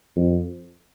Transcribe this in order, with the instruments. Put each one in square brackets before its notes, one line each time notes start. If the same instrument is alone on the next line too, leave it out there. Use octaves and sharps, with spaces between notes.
[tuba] F2